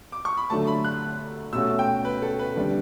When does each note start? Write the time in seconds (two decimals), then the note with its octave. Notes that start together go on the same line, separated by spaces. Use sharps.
0.12 D6
0.25 C#6
0.37 B5
0.50 D3 F#3 A3 A5
0.67 B5
0.84 F#6
1.53 B2 A3 C#4 F#4 E6
1.79 G5
2.05 B4
2.22 A4
2.39 B4
2.56 D3 G3 D4